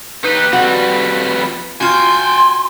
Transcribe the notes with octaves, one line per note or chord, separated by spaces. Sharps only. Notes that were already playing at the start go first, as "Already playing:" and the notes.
D#4 G4 B4
F2 G3 F#4
F4 F#4 G5 G#5 C6 G6